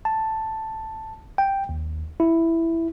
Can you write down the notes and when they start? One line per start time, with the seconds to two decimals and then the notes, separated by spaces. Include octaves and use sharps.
0.05 A5
1.38 G5
1.69 D#2
2.20 E4